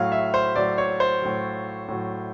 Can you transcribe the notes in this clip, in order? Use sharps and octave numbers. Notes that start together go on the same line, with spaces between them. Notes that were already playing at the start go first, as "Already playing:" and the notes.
Already playing: A2 F#3 F5
E5
C5
A2 F#3 D5
C#5
C5
A2 F#3
A2 F#3